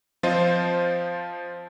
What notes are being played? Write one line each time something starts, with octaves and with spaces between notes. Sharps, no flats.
F3 C4 F4 C5 D#5